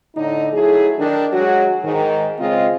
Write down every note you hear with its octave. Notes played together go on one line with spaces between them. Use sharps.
A2 D3 D#4
F#3 A3 E4 G#4
D#3 D4
F#3 G#3 F#4
G#2 D#3
C#3 G#3 C4 F4 D#5